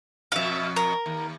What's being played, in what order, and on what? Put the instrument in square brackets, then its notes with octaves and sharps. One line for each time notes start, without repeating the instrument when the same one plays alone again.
[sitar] F2 B2 [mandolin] E5 F5
[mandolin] A#4
[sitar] D#2